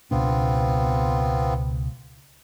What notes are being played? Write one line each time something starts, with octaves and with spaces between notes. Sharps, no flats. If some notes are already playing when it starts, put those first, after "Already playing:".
C#2 B2 B3 C4 D4 F4